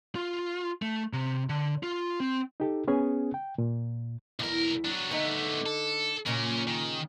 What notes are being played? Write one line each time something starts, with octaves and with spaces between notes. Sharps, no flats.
F4
A3
C3
D3
F4
C4
D#4 G4 A4
B3 C#4 G#4
G5
A#2
B1 E2 E4 A#4
F#3 D4
D3 A3 B3 D#4
A4
A#2 C#3 C#4 A#4
D#3